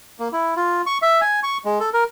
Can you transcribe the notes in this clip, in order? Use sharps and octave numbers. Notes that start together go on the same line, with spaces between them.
A#3
E4
F4
C#6
E5
G#5
C#6
G#3
A4
A#4